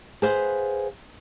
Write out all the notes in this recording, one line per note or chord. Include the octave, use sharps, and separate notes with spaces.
G#4 B4 C5 F5 F#5